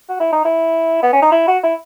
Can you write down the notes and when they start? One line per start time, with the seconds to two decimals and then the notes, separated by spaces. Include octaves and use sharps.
0.09 F#4
0.20 E4
0.33 D#4
0.45 E4
1.02 B3
1.13 C#4
1.22 D#4
1.32 E4
1.47 F#4
1.63 E4